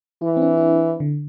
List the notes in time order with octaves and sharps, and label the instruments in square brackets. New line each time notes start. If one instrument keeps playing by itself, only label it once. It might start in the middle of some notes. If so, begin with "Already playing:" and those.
[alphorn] E3 [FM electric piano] E4
[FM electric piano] C4
D4
E4
D4
D3